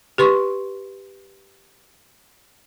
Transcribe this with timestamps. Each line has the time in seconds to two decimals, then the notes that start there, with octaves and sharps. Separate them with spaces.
0.18 G4 B4 C6 C#6